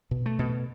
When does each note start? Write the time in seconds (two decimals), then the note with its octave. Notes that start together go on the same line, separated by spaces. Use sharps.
0.11 B2
0.26 A3
0.39 B2